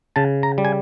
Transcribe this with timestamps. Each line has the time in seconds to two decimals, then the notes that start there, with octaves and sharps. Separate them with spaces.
0.16 C#3 A5
0.43 A#5
0.58 G3
0.65 G#5